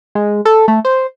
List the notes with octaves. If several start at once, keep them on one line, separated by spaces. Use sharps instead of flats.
G#3
A4
A3
C5